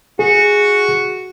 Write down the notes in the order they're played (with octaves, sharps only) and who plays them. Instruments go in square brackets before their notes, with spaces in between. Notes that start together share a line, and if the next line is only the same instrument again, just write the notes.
[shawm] F#4 [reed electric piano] G#4